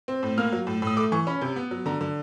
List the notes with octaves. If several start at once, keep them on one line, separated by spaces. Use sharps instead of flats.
C4
A2
A#3 F6
F#3
A2
A2
D#6
A3 D6
E3 C#6
C#4 B5
C3
B3
F#3
D3 A#5
D3